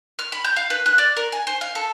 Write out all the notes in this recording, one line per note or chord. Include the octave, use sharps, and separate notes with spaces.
F6
B5
G6
F5
B4
F#6
D5
A#4
G#5
C5
F5
A4